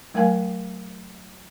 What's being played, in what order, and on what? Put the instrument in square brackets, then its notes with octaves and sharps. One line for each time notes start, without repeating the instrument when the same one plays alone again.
[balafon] F#3 A3 A#4 F5 G#5